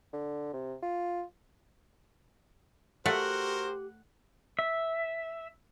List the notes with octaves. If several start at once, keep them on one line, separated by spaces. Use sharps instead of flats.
D3
C3
F4
A3 F#4 G4 A#4 C5 F#5
E5